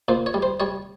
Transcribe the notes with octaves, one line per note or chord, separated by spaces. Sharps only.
A#2 C5
C#5
G3
C5
G3 C#5